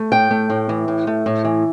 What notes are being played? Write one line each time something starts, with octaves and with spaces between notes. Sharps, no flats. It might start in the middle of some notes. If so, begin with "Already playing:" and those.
Already playing: A3
A2 G5
A3
A2
E3
A2
A3
A2
E3